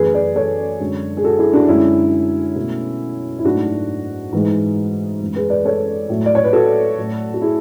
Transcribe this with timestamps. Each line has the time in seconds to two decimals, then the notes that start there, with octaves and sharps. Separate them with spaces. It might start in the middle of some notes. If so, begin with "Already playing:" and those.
Already playing: F#2 E3 A3 G#4 B4
0.14 B4 D5
0.36 A4 C#5
0.80 F#2 D3 G#3
1.17 G#4
1.24 F#4 A4
1.39 E4 G#4
1.53 D4 F#4
1.68 F#2 D3 G#3 C#4 E4
2.56 B2 A3
3.39 E4
3.44 G#2 F#3 A3 D4 F#4
4.33 G#2 E3 G#3
5.21 F#2 E3 G#3
5.36 G#4 B4
5.50 B4 D5
5.65 A4 C#5
6.09 A2 F#3 A3
6.26 D5
6.35 C#5
6.44 B4
6.53 F#4 A4
6.98 A2 F#3 A3
7.34 F#4
7.41 E4 G#4